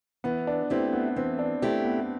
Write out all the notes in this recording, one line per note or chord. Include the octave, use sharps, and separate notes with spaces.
E3 B3
D4
A3 C4 E4 G4
B3
E3 C4
D4
A3 C4 E4 G4
B3